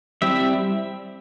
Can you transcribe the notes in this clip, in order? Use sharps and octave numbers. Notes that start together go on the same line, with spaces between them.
G3 C4 E4 E5